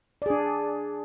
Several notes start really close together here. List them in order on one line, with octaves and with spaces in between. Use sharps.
D5 G#4 D4